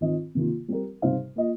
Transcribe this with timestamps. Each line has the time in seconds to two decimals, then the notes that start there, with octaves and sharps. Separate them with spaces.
0.01 D#3 C4 F4 D#5
0.35 C3 D#3 A#3 F4
0.68 G3 C4 G4 A#4
1.02 C3 G3 D#4 C5 F5
1.36 A#3 F4 D#5